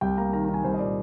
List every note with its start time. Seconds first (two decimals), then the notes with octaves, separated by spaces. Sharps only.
0.01 C2 G5
0.18 A#3 A#5
0.33 D#3 A#5
0.44 A#5
0.49 D#3 G#5
0.64 C2 C5
0.74 D#5
0.79 A#2 D5